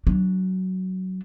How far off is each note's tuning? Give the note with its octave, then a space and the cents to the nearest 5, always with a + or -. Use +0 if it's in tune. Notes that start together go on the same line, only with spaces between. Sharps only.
F#3 +10 D4 +0